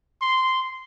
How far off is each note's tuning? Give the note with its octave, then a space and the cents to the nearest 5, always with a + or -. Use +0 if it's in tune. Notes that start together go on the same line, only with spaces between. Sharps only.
C6 -10